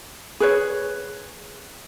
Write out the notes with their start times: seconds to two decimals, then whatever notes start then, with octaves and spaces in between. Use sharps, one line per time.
0.40 G#4 B4 C#5